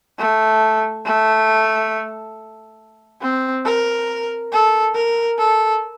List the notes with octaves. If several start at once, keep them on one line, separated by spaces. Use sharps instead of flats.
A3
A3
C4
A#4
A4
A#4
A4